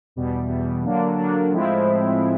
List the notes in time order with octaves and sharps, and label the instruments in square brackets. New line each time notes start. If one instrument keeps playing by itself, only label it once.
[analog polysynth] E2 B2 G3
E2 B2 G3
D3 F#3 A#3 D4
D3 F#3 A#3 D4
A2 F3 G#3 C4 E4